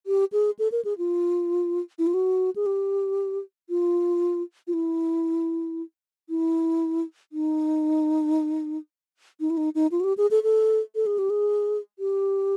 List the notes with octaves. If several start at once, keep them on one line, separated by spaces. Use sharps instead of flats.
G4
G#4
A4
A#4
G#4
F4
E4
F4
F#4
G#4
G4
F4
F4
E4
E4
D#4
D#4
E4
D#4
D#4
F4
F#4
G4
G#4
A4
A4
A4
G#4
G4
G#4
G4